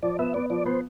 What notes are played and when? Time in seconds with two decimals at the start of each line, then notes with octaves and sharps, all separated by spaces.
0.03 F3 D5
0.19 B3 E5
0.34 B3 D5
0.50 F3 D5
0.66 B3 C5